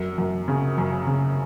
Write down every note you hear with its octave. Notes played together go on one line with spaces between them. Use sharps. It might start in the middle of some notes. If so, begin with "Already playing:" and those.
Already playing: F#2
F#2
C#3
F#2
C#3